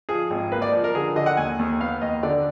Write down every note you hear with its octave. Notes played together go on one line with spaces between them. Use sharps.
F3 G#4
G#1
A#3 B4
D5
F3
A#4
D3 G#4
D3 D#5
F#5
D#2 G#5
D#2
B3 F5
D#2 D#5
D3 D5